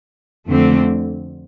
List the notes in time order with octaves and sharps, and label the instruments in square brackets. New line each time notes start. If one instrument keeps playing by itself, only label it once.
[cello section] F2 D3 A3 C4